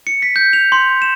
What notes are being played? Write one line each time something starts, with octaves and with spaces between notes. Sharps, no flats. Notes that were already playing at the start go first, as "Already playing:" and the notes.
C#7
B6
G6
F7
C6
E7